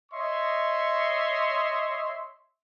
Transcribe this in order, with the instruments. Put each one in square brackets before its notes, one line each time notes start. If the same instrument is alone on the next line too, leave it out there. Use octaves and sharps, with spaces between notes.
[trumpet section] C#5 D#5 E5 C6 C#6